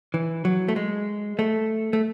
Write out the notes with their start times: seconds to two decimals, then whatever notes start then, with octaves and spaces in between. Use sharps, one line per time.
0.14 E3
0.45 F#3
0.68 A3
0.76 G#3
1.39 A3
1.93 A3